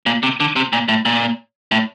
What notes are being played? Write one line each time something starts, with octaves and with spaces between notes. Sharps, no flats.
A#2
C3
D3
C3
A#2
A2
A#2
A2